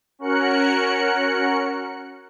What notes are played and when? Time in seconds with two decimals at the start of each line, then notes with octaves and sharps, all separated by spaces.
0.19 C#4 F#4 A#4 F#6 C#7